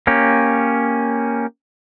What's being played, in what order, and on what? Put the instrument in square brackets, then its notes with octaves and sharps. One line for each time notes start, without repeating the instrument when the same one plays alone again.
[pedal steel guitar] A#3 C#4 G4